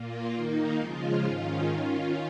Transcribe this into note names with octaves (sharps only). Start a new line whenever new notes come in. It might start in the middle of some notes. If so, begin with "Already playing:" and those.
Already playing: A#2 A#3 F4
D#3 A#3 D#4
C#3 F3 G#3 F4
G#2 D#3 C#4 F4
D#3 C#4 F4